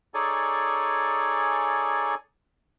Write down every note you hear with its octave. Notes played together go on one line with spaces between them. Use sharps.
D#4 G#4 A4 C#5 D5 G#5